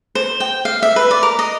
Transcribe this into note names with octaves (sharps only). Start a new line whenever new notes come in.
C5
G5
F5
E5
B4
D5
A#4
D#5